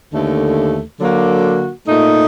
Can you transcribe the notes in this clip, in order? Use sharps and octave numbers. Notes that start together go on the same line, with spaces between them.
D#2 D3 A3
D3 F#3 A#3 F#4
A#2 A3 D#4